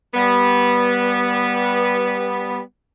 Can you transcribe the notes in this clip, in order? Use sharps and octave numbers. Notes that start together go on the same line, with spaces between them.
G3 B3